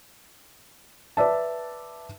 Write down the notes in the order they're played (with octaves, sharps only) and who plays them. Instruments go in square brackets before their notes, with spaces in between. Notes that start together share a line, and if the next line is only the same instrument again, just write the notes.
[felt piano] B4 D5 E5 A5